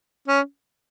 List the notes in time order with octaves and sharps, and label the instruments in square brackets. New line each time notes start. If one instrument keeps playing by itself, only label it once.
[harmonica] C#4